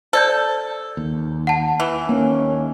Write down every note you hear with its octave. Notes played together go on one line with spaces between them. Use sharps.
A4 C5 D5 G6
D#2
F#5 A5
E3
D#2 A#3 C#4